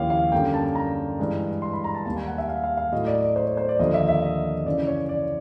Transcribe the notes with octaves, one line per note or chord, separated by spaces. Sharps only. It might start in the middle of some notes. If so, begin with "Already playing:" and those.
Already playing: D#2 C#3 F3 E4 G4 C#5 F5
F5
F#2 D3 G3 A#3 G5
A5
A#5
G2 E3 G#3
C6
B5
A#5
A5
D#2 D#3 G3 A#3 A5
G#5
F#5
E5
F5
F5
F5
A2 F#3 A3 D#5
D5
D5
C5
C#5
C5
D5
D#2 D3 F3 A#3 D#5
E5
E5
D#5
F#2 C#3 E3 D5
C#5
D5